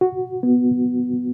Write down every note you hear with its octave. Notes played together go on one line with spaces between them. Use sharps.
F#4
B3